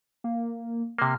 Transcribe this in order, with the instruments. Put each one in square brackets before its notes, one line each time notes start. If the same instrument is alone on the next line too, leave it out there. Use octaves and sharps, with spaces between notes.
[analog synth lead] A#3
[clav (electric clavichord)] C3 A#3 [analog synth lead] F6